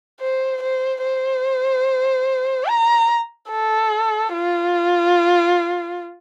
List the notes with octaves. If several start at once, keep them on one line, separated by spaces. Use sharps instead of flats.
C5
C5
C5
A#5
A4
F4